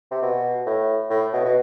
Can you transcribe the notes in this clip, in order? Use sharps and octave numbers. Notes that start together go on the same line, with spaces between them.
C3
B2
A2
A2
B2
B2